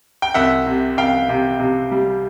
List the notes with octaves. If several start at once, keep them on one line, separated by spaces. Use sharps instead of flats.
G5
C2 E5 F#5
C3
C2 F5 G5
C3
C3
G3